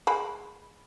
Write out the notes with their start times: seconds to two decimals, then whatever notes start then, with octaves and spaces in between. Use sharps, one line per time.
0.07 G#3 B5